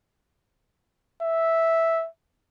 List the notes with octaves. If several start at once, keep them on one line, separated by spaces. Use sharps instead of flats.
E5